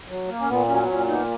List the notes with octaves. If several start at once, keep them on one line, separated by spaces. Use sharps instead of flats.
F#3
A#3
C#4
A#2 B3
F#3 C#4
B3
A#2 C#4
A#3 B3 D#4